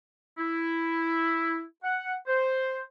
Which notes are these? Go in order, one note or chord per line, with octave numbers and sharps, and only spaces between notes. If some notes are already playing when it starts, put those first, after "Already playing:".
E4
F#5
C5